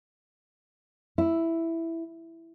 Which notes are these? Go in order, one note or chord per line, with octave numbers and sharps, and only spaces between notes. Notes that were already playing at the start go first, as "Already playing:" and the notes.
E4